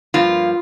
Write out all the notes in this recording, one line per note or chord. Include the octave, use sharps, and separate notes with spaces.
G2 F3 A#3 F4